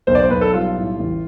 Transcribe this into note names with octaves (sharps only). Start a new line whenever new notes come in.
B1 C5
D5
C5
B1 B4
A4
G3 F4
A2
A1